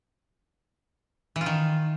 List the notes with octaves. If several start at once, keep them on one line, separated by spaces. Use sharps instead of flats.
E3
F4
D#3